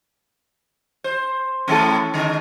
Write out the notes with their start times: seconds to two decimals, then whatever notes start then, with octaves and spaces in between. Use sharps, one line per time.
1.04 C5
1.68 A2 E3 A3 C#4 E4 A4
2.14 D3 G#3